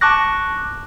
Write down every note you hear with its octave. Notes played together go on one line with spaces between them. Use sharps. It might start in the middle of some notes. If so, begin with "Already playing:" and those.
A5 C#6 D6 F#6 A#6